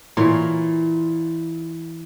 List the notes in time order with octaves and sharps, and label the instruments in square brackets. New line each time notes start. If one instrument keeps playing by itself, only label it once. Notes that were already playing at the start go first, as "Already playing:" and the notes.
[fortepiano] A#2 C6 [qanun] E3 A#4 C#5